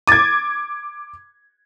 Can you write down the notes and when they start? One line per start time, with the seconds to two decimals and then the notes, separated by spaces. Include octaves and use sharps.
0.07 D6 G#6 A6 D#7